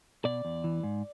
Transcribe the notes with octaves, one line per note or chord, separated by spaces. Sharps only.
B2 D5
E2
E3
G#2